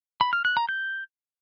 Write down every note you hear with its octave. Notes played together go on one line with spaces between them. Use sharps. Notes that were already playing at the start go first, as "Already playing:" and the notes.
B5
F6
F#6
A#5
G6